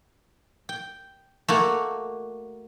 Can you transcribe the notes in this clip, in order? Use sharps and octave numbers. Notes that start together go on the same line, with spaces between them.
G5
A3 A#3 F#4